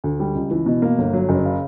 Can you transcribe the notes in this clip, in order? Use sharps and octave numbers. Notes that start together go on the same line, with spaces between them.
D2
G3
C#2
E3
B2
A#3
G1
F#3
F#1
C#3